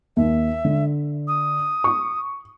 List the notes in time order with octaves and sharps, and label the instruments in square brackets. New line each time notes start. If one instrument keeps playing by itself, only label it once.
[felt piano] D#2 [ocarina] E5
[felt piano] D3
[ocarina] D#6
[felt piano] C#6